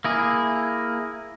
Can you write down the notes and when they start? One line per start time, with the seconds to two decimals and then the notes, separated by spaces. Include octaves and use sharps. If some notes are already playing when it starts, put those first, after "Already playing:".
0.04 A#3 E4 G#4